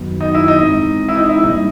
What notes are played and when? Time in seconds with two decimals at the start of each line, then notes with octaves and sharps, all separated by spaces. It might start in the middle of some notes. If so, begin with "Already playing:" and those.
Already playing: F#2 D#3 F#3 B3
0.21 D#4
0.35 E4
0.48 D#4
0.62 G#2 E3 G#3 C4
1.08 E4
1.16 D#4
1.29 E4
1.44 C3 E3 G3 A#3 D4 D#4